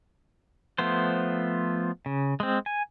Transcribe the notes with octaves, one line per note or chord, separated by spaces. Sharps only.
F3 A3 B3 C5
C#3
G#3 C4
G#5